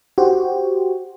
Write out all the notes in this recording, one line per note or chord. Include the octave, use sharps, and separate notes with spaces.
F#4 G4 C5